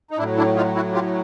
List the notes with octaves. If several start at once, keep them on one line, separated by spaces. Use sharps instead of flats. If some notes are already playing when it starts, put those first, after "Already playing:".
D#4
A2 F#3 D4 E4
D4 E4
D#4 F4
E4 F#4
F4 G4